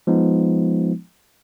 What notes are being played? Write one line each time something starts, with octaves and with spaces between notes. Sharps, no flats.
F3 G#3 B3 D#4